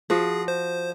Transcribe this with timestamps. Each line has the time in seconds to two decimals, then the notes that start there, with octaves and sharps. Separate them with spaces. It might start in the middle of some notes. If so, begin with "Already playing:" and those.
0.10 F3 F#4 G#4
0.48 C5